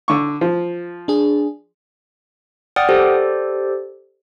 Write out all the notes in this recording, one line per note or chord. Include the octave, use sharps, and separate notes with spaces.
D3 C#6
F3
D4 G#4
D5 F#5 G5 D#6 F6
G4 A4 C5 D5